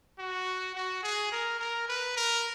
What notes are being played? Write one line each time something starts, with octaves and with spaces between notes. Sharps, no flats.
F#4
F#4
G#4
A#4
A#4
B4
A#4